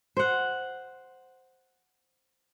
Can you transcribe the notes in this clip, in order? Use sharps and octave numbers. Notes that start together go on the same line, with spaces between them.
C5 F#5